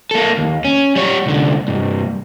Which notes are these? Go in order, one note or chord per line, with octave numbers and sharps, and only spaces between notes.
A#3 A4
D#2
C#4
G3 C#5
C2 D3
C2 G2